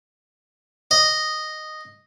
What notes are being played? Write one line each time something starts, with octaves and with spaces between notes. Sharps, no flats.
D#5